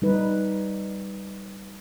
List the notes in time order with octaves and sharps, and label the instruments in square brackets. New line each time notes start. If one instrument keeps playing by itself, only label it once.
[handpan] G3 D#4 B4